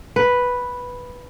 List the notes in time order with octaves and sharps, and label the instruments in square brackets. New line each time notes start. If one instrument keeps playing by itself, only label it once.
[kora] B4